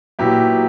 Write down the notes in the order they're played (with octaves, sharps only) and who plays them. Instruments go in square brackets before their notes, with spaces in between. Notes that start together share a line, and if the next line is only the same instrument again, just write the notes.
[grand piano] A#2 F#3 B3 E4 G4